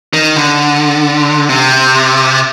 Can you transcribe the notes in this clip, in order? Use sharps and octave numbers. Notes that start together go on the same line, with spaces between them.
D#3
D3
C3